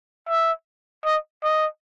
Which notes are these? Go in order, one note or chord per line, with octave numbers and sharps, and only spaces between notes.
E5
D#5
D#5